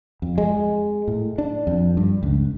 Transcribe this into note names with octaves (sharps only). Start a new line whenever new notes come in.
F2
G#3
A2
D4
F2
G2
C#2